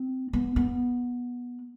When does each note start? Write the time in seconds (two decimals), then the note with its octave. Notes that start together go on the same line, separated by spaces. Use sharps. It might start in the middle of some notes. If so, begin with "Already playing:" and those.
Already playing: C4
0.33 B3
0.56 B3